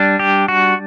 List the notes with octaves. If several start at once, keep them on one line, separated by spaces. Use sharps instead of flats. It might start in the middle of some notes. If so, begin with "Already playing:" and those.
Already playing: G3 D4
G4
F#4